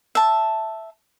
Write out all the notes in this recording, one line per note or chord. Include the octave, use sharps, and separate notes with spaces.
E5 A5